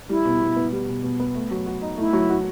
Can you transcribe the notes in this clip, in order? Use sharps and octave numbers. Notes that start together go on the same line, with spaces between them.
G3 E4
B2
B2
B3
G3
B2
B2
B3
A3
F#3
F#4
D#4
A3 E4
F#3
F#4